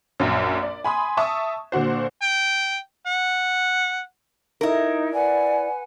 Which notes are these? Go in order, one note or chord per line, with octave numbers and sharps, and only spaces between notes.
A#1 F#2
D5
G#5 B5 C6 D#6
E5 A5 C#6 D#6
A#2 D3 F#4 C5
G5
F#5
D#4 E4 A#4
B4 D5 F#5 G#5